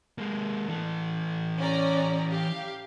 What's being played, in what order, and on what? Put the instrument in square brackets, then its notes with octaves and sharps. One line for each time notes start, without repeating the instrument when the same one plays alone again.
[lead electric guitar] G#3 A#3
E3 A4
[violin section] C#4 D5 A#5
G4 F5